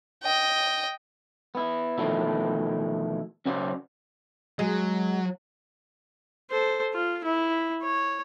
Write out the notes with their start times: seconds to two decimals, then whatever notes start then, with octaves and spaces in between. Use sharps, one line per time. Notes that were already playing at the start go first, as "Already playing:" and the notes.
0.23 D#5 G5
1.55 B3 E4
1.98 E2 B2 D#3 F3 A3 E4
3.46 F#2 C#3 C#4 F#4 C5 D5
4.59 F#3 G#3
6.50 A4 C5
6.94 F4
7.24 E4
7.82 C#5